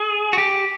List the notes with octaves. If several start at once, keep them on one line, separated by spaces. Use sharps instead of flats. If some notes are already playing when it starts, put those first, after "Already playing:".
Already playing: G#4
F#4
G4